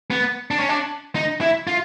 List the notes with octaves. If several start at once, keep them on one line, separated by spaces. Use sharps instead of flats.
B3
D4
C#4
D4
D#4
E4
F4